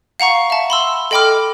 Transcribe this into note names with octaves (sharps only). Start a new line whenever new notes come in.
F5 F#5 A#5 C#6
E5 A5
B5 C6 E6
A4 D#5 G5 B5 D6 F6